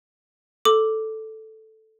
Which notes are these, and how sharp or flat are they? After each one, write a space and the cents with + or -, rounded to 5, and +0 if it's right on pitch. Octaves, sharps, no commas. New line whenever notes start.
A4 +0 D6 +0